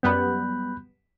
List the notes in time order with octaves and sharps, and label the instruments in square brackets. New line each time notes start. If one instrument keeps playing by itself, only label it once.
[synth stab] F#2 G3 B3 [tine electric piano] B5 F#6 G6